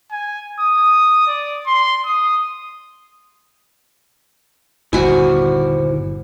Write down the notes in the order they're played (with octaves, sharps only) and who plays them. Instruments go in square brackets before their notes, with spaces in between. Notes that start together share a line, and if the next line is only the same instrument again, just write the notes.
[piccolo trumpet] G#5
D#6
D5
C6
D#6
[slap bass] G1 D#2 A#2 [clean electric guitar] E4 C5 F#5 [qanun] F#4 G#5